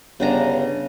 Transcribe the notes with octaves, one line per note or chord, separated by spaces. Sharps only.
G1 C#3 D4 A#5